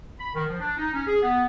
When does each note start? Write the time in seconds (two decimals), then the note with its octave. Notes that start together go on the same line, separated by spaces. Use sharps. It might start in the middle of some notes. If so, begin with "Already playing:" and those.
0.18 B5
0.34 D#3
0.48 F3
0.60 D4
0.77 D#4
0.94 C#4
1.06 G#4
1.21 B3